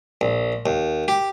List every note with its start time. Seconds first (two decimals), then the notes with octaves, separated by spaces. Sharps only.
0.21 A#1
0.66 D#2
1.08 G4